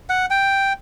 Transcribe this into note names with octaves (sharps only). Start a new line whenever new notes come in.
F#5
G5